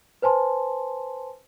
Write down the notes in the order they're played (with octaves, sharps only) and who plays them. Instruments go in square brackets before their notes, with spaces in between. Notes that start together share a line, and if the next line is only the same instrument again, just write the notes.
[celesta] B4 C5 G#5 A5 C6